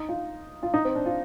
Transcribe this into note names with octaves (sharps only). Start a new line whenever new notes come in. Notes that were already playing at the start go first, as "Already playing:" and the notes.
Already playing: D#4
F4
F4
D#4
C4
D4
F4